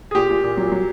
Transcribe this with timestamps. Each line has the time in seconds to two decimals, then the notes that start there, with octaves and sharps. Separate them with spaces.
0.11 G#4
0.15 A#2 G4
0.30 A#2
0.43 A#2
0.57 F#3
0.72 F#3